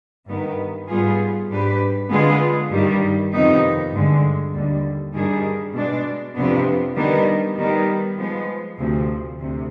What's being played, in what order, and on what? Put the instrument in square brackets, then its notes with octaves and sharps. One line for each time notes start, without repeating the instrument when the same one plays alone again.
[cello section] G2 D#3 B3
G#2 G3 B3 F4 G#4
G#2 G3 D4 G4 B4
D3 G#3 B3 F4 G#4
G2 D#3 G3
F2 C3 D#3 B3 D#4
G2 D3 G#3
D#2 D3 G3
G2 D#3 G3 D4 G#4
B2 G#3 D4
F2 C3 F3 B3 D4
D#3 G3 B3 D4
D#3 G3 B3
F3 G#3 B3
D2 C3 F3
D2 C3